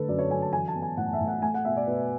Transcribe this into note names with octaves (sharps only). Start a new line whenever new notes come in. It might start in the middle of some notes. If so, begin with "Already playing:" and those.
Already playing: D3 A3 A4 B4
F#2 D5
C#5
F#2 G#5
A5
E3 G#5
A5
B3
G#5
A2 F#5
E5
A2
F#5
A3 G#5
F#5
B2 E5
D5
B2 B4